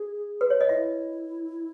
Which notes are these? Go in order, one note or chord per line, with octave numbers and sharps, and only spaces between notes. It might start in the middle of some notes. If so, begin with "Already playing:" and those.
Already playing: G#4
B4
C#5
D#5
E4 E5